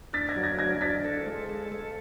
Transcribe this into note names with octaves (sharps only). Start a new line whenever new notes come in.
D4 A6 B6
G#6 A#6
F#3
G#6 A#6
D4 G#6 A#6
D4 A6 B6
A4
G#3
A4
A4